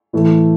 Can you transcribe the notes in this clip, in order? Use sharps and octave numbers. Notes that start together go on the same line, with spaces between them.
A2 E3 A3